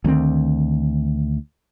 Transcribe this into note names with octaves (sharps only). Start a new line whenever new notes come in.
D2 D#3 G3 C4